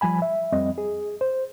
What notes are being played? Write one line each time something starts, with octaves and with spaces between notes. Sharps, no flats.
F3 G3 G#5 B5
E5
F2 G3 C4 D#5
G#4
C5